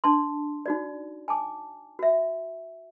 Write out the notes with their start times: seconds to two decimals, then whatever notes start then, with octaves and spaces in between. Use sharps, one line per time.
0.04 D4 A5 C6
0.66 D#4 F#4 D5
1.28 G#5 A5 D6
1.99 F#4 E5